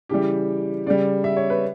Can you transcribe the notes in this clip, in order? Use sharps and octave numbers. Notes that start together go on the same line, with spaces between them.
C#3 E3 G3 G4
C#3 G3 D5
E5
C#5
B4